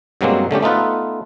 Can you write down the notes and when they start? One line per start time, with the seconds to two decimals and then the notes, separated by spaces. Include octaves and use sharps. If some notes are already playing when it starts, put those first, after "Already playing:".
0.21 G2 B2 F#3 G#3 A#3 C4
0.51 D3 A3 C#4 G4
0.63 A3 B3 D#4 F4 A4 B4